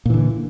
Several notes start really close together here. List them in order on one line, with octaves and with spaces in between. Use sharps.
A#2 E3 D3